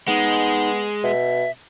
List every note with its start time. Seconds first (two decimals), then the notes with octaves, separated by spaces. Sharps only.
0.08 G#3 B3 D#4
1.04 B2 E5